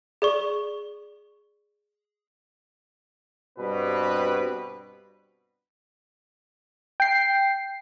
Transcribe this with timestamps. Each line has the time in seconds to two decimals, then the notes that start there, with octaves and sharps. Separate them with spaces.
0.22 G#4 D5 C#6
3.59 G2 B2 G3 C4 B4
7.00 G5 C7